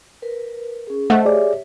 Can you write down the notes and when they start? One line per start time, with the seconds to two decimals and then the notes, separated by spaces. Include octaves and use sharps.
0.22 A#4 B4
0.87 C#4 G#4
1.10 A3 C5 D#5 F#5 A5
1.26 G4 G#4 C#5 D5 E5